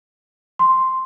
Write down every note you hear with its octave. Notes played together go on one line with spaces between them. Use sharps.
C6